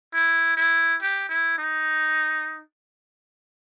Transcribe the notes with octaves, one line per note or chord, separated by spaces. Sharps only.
E4
E4
G4
E4
D#4